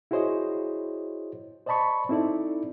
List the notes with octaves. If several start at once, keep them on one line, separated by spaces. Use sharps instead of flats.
E4 F#4 G#4 C5 C#5 D#5
C5 D5 D#5 A5 B5 C#6
C4 D#4 E4 A4 D5